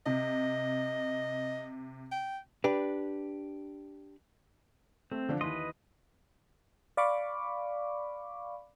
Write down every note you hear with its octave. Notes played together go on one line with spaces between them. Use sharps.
C3 D#5
G5
D4 G4 B4
A3 C4
D3 F3 D4
D#2 E3 B4 D#5 C6
D5 F5 B5 C#6 D6